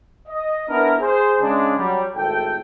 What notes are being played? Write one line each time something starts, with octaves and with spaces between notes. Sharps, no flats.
D#5
B3 D4 E4 A#4
G#4 C5
C#3 G#3 D4
F#3 G3
G#1 A2 A4 G5